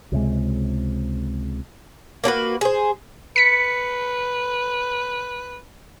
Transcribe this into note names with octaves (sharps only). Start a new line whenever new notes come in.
C#2 C3 G#3
A#3 D4 F#4 B4
G#4 C5
B4 B6 C#7